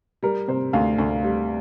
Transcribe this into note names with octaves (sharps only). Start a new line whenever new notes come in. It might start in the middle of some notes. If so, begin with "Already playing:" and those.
G3 A#4
C3 C5
D2 F5
D2
G3